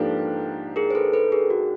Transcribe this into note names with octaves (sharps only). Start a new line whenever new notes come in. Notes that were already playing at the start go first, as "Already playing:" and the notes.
Already playing: G#2 F3 A#3 D4 G4 A4 B4
G#4 A#4
C5
A4 B4
A4 B4
G#4 A#4
F#4